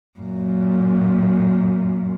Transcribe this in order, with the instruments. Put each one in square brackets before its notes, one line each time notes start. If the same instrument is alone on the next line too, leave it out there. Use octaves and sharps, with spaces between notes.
[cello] F#2 A#2